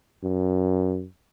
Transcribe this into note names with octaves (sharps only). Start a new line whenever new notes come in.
F#2